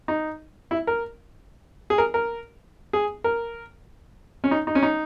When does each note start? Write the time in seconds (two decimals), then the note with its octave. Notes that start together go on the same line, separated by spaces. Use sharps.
0.08 D#4
0.71 E4
0.87 A#4
1.90 G#4
1.98 A#4
2.14 A#4
2.93 G#4
3.24 A#4
4.44 C#4
4.51 D#4
4.67 D#4
4.75 C#4
4.83 D#4